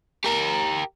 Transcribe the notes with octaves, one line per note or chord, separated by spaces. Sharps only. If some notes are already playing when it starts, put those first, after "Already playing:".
G4 A#4